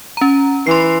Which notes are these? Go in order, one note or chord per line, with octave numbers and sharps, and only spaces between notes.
C#4 A#5
E3 C6 C7